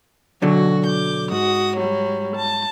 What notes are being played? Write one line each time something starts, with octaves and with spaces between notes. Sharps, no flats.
B1 D3 F#3 F#4
D6 G6
G#2 F#4 D#6
F#3 G3
A5